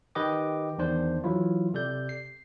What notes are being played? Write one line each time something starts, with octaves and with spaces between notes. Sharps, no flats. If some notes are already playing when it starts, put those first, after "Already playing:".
D#3 G4 B4 D#5 G5 D6
E2 D#3 D4 C5
E3 F#3 E4 F4
C3 A4 D5 G6
C7